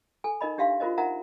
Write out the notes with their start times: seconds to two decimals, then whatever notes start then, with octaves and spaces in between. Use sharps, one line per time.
0.24 A4 G#5
0.41 D#4 A#4 D#5 B5
0.58 D4 G4 E5 F5 C6
0.80 F4 F#4 A#4 C5 D#5
0.98 D#4 A#4 E5 F#5 A#5